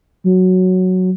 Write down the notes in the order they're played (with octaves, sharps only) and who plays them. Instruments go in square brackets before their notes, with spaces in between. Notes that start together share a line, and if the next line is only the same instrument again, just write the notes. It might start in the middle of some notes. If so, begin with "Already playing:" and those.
[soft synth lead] F#3